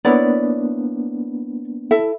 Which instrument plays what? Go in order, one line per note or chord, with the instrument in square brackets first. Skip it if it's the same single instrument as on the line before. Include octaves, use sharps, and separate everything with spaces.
[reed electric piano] A#3 B3 D4 [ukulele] E4 C#5 D5
[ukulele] E4 A4 E5